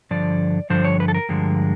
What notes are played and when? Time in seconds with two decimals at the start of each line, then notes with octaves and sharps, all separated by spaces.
0.11 G2 D3 F3 D5
0.70 G2 D3 F3 C5
0.85 C#5
1.00 B4
1.08 A4
1.15 A#4
1.29 G2 D3 F3 G#3